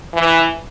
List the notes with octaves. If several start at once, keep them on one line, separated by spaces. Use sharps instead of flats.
E3